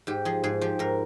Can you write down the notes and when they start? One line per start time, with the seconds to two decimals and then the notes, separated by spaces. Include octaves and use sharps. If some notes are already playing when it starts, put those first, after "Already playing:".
0.07 G#2 G4
0.25 F3 G#4
0.43 G#2 G#4
0.61 F3 G4
0.79 G#2 A#4